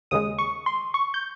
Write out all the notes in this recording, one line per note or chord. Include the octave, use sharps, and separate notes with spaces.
D#2 C#3 G#3 D#6
C#6
C6
C#6
G6